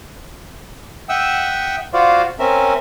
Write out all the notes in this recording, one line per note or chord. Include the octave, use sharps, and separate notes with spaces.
E5 F#5 G5 D#6 E6
F4 F#4 C5 D5 F5
C4 C#4 A#4 E5